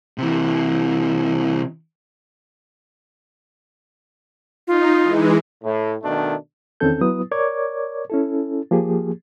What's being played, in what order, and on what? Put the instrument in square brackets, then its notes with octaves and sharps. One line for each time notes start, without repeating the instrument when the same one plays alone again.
[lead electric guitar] C3 E3
[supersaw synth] D#4 [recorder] F4
[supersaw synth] E3 G#3
[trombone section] A2
B2 D#3 A3 D4
[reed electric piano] E2 D#3 C4 C#4 A4 G6
F#3 B3 E4 B4 D#6
A#4 C#5 D5 C#6 D6 G#6
C#4 E4 A4
F3 A#3 G4 G#4